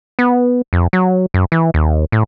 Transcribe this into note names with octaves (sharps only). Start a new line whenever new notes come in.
B3
F2
F#3
F#2
E3
D#2
A2